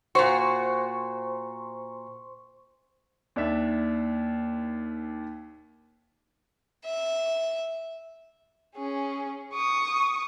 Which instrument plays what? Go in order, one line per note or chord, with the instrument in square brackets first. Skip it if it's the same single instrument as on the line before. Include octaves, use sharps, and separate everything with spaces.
[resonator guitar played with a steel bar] A#2 F#4 [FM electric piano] C5 C6 C#6
[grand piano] D#2 D4 E5
[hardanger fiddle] E5
[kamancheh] C#4 G#4
C#6 D#6